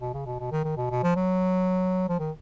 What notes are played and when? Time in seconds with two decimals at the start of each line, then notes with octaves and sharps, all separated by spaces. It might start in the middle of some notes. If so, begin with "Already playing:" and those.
0.01 B2
0.14 C#3
0.26 B2
0.39 B2
0.52 D#3
0.64 D#3
0.77 B2
0.91 B2
1.03 F3
1.16 F#3
2.09 F3
2.19 D#3